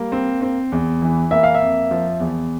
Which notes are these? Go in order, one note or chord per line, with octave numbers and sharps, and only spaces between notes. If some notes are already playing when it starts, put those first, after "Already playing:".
Already playing: G3 A#3
C4
C4
E2
E3
A#3 E5
F5
E5
F2
F3
E2